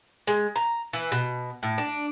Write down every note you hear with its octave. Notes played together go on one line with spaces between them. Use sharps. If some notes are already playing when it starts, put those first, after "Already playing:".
G#3
A#5
E3
B2
A2
D4